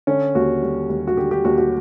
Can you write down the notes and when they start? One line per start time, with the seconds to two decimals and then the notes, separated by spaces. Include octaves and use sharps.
0.07 D3 C#4
0.35 D#2 F#4
0.62 G3
0.90 D#2
1.07 F#4
1.17 D3 G4
1.31 G4
1.45 D#2 F#4
1.58 F#4